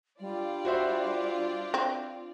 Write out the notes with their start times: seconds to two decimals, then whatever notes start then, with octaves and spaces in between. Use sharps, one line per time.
0.20 G3 D4 F4 D5
0.65 F#4 C5 E5
1.74 C4